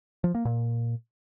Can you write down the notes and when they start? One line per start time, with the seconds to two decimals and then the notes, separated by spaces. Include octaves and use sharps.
0.24 F3
0.35 A#3
0.45 A#2